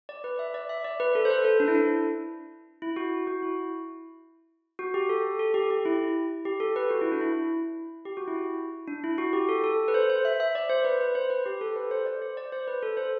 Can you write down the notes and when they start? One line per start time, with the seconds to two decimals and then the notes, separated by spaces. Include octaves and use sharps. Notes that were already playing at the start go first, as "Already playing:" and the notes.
0.09 D5
0.24 B4
0.39 E5
0.54 D5
0.69 E5
0.84 D5
1.00 B4
1.15 A4
1.25 C5
1.30 B4
1.45 A4
1.60 D4
1.68 E4
1.75 D4
2.82 E4
2.96 F#4
3.27 F#4
3.43 E4
4.79 F#4
4.94 G4
5.09 A4
5.39 A4
5.54 G4
5.70 G4
5.85 E4
6.45 G4
6.60 A4
6.76 B4
6.90 F#4
7.01 E4
7.12 D4
7.21 E4
8.05 G4
8.17 F#4
8.28 E4
8.88 D4
9.04 E4
9.18 F#4
9.33 G4
9.49 A4
9.64 A4
9.88 B4
9.94 C5
10.10 C5
10.25 E5
10.40 E5
10.55 D5
10.69 C5
10.85 B4
11.01 B4
11.15 C5
11.30 B4
11.46 G4
11.61 A4
11.76 B4
11.91 C5
12.06 D5
12.22 C5
12.37 D5
12.52 C5
12.68 B4
12.83 A4
12.97 C5